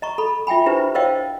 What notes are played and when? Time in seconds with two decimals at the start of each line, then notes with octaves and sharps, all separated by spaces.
0.02 D#5 A#5 C#6
0.18 A4 B5
0.47 F4 E5 G5 G#5 B5
0.66 D4 E4 G4 B4 C5
0.95 A#4 C5 C#5 D#5 F5 G5